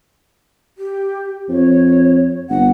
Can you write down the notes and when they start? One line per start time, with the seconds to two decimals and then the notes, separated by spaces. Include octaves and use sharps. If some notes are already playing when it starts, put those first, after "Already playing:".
0.78 G4
1.49 F2 C#5
2.50 G1 F#5